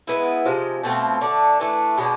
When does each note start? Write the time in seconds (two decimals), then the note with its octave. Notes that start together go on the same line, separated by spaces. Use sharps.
0.07 G#3 B3 E4
0.45 C3 F3 G#3
0.83 B2 A3 C4 F4
1.21 D3 A3 D4
1.60 E3 A3 D4
1.97 B2 G#3 D4